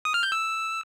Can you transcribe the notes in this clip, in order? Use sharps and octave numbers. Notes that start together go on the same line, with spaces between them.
D#6
F6
G6
E6